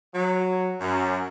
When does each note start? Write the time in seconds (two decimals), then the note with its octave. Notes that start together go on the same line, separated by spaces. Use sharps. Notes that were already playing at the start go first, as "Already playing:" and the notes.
0.14 F#3
0.81 F#2